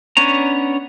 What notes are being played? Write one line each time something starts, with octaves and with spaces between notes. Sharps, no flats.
B3 C#4 D4 C#5 A#5